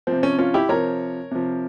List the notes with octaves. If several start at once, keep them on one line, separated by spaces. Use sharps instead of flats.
F3 C4
C3
C#4
C#4 F4
E4 G4
C3 F3 A#4 C#5
C3 F3